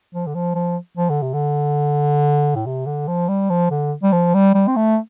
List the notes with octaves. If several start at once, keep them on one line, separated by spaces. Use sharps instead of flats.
F3
D3
F3
F3
F3
D3
C3
D3
A2
C3
D3
F3
G3
F3
D3
G3
F3
G3
G3
C4
A3